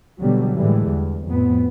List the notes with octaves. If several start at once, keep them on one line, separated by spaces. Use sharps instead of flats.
B2 D3 F#3 G3 B3
A2 D3 E3 G3 G#3
E2
F2 A2 B3